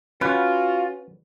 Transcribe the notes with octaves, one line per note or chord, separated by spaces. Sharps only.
C#4 F4 F#4 B4